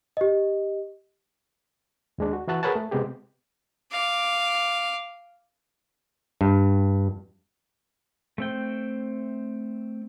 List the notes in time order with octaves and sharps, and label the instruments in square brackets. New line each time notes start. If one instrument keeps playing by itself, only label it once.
[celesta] G4 D#5
[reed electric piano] D#2 G#3 D4
F#4
E3 E4 F#4 A5 F#6
G#4 A#4 B4 C#5 F#5 A5
A3
C3 G#3 B3 G4 G#4
[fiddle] F5 D6
[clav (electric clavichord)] G2
[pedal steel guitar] A3 C4 G5